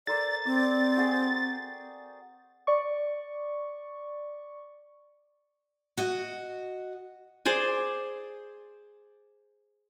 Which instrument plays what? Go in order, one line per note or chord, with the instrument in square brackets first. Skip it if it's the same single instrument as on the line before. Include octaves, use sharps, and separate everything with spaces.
[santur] A4 A#4 C5 [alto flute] D5 [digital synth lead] A6
[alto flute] C4 [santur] D5
[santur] F#4 G#4 G5
[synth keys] D5 C#6
[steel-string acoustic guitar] F#4 D#5
[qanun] G#4 C5 D5 G#5